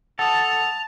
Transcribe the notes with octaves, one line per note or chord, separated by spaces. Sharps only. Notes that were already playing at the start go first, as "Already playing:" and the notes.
A4 F#5 A5 D#6 F7